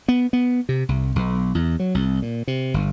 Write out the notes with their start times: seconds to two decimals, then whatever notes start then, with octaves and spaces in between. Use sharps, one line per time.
0.08 B3
0.33 B3
0.69 C3
0.89 C2
1.16 B1
1.55 E2
1.80 F#3
1.95 C2
2.22 A#2
2.48 C3
2.74 G1